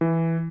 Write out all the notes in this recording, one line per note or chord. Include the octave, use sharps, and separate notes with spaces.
E3